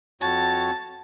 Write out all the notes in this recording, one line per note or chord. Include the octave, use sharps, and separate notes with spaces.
F2 F#4 C#5 A5